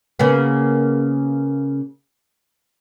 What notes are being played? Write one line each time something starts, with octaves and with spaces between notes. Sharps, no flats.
C#3 A#3 B3